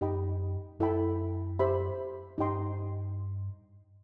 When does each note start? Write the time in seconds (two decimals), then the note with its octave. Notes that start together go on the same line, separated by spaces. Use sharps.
0.01 F#2 D#4 G4 D#5 G5 B5
0.79 F#2 E4 A4 E5 G5 B5
1.59 G4 C5 E5 B5
2.38 G2 D#4 G4 D#5 G5 C6